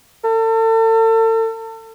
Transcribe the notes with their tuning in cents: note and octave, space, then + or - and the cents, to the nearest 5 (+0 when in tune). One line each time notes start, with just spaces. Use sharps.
A4 +40